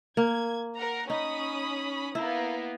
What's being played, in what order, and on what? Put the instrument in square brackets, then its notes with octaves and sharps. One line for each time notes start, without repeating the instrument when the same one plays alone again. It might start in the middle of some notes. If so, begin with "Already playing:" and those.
[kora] A#3 [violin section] G#6
[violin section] A#4 F#5 A#5
[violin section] C#4 B5 D#6 [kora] D#4
[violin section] A#3 B3 [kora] E4